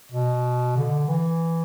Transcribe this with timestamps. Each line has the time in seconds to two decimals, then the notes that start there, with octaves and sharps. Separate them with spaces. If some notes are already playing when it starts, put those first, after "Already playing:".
0.12 B2
0.76 D3
1.08 E3